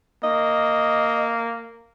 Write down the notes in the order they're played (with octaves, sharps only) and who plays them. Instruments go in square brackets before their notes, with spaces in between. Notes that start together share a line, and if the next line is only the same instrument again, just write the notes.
[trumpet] A#3 [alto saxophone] D#5